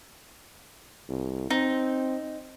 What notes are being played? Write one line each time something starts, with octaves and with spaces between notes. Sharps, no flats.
C2
C4 D#4